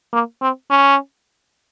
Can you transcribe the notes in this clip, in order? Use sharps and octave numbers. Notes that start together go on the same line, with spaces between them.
A#3
C4
C#4